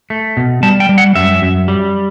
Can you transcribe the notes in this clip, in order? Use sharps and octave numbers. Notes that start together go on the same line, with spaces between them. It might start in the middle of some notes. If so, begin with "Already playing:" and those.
A3
B2
G3 A5
G5
G3
F#5
F#2 E5
F#2
G3